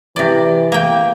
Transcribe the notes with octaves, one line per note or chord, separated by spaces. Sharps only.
C3 E3 D5
A#3 G5